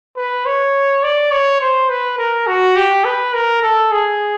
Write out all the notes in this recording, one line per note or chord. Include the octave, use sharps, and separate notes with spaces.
B4
C#5
D5
C#5
C5
B4
A#4
F#4
G4
B4
A#4
A4
G#4